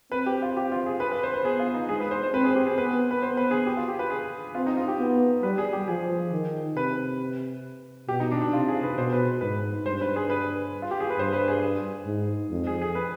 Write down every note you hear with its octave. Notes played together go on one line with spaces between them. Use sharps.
C4 B4
G4
F4
G4
F4
G#4
B4
B4
C5
B4
B3 G#4
F4
D#4
G#3 G#4
B4
C5
C5
C4 B4
G#4
G4
G#4
B3 B4
B4
B3 C5
B4
G#4
G4
F4
G4
B4
G#4
C4 F4
D#4
F4
G4
B3
G3 B4
G#4
G4
F3 G#4
D#3
C3 B4
B2 G4
D#4
D4
D4
C3 F4
G#4
B4
B2 C5
B4
G#2 B4
G2 C5
B4
G#4
B4
F4
G4
G#4
B4
G2 C5
B4
G#4
G#2
F2
G#4
G#4
B4